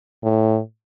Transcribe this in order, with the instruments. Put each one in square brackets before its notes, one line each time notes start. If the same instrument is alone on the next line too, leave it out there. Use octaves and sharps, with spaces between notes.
[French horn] A2